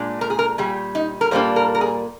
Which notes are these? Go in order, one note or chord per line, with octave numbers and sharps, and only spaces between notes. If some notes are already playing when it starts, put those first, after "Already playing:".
Already playing: A#2 G#3 D4
A#4
G#4
A#4
A#2 G3 G#4
D#4
A#4
A#2 G3 A#3 D4 C5
A#4
A#4
G#4